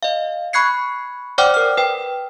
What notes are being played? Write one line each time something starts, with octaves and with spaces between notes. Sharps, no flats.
D#5 F5
B5 C#6 F#6 G#6 C7 C#7
C5 D5 F#5 G5 D6 F6
A#4 F6
B4 G5